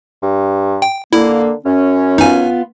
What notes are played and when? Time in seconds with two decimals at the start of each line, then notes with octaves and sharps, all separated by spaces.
0.22 G2
0.82 G5
1.13 D3 A#3 E4
1.65 F#2 C#4
2.18 B3 D#4 F4 G#5